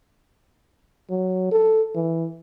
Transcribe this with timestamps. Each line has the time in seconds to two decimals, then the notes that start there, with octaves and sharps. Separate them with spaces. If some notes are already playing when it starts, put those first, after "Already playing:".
1.10 F#3
1.51 A4
1.95 E3